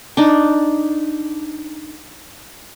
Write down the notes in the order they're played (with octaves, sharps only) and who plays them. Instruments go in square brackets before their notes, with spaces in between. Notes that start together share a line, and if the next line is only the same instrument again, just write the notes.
[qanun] D4 D#4